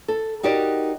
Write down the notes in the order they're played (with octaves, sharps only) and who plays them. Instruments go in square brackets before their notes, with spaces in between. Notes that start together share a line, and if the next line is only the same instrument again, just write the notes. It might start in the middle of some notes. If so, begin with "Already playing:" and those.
[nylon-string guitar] A4
D#4 F#4 G4 A#4 D5